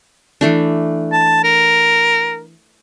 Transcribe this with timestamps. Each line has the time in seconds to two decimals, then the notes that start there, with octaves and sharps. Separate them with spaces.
0.41 E3 A3 D4
1.12 A5
1.44 A#4